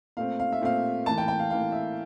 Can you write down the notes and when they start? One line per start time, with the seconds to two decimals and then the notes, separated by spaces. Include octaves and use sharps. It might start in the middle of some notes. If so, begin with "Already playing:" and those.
0.17 A#2 A3 C4 F5
0.40 F5
0.52 E5
0.61 A#2 A3 C4 F5
1.06 A2 E3 A#3 A5
1.18 G5
1.28 G5
1.39 F5
1.50 A2 E3 A#3 F5
1.72 E5